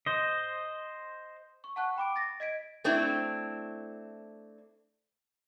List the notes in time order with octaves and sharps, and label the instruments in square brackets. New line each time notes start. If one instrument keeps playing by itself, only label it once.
[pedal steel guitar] C5 D#5
[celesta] C#6
F#5 A5 C#6 F#6
G5 B5 D6 D7
A6 A#6
D#5 G#6 B6 D7
[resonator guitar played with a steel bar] A3 C4 D4 E4